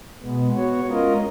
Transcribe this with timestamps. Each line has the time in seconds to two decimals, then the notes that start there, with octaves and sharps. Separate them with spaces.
0.21 B2 G#3 B3
0.54 B3 F#4 C#5
0.87 G#3 C#4 F4 A#4 D#5